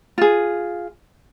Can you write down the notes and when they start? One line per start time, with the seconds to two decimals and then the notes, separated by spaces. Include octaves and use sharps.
0.18 F4 G#4